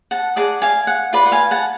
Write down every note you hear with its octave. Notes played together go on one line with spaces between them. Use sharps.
F#5 A5
G#4 D5 F#5 A5
F5 G#5
F#5
F4 B4 D5
F#5
F5 G#5
F#5 A5